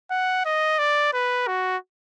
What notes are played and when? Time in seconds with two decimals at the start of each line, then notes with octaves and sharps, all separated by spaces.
0.11 F#5
0.45 D#5
0.79 D5
1.13 B4
1.48 F#4